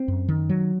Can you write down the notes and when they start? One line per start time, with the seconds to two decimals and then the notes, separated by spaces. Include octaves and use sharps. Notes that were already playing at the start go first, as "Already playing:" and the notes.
Already playing: C4
0.08 F#2
0.28 D#3
0.49 F#3